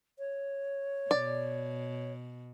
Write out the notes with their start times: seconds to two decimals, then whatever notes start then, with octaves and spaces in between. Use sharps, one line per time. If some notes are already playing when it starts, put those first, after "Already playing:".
0.19 C#5
1.11 B2 D5